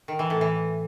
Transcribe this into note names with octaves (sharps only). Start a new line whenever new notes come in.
D#3
E3
A2
E3